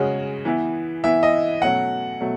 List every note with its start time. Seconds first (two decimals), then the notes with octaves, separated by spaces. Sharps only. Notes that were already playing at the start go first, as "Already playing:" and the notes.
Already playing: C#3 G#3 C#4 F#4
0.45 E3 B3 E4
1.04 E3 B3 E4 E5
1.23 D#5
1.62 B2 F#3 A3 C#4 F#5
2.21 B2 F#3 A3